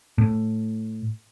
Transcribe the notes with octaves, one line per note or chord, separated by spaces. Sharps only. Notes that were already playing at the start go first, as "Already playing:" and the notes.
A2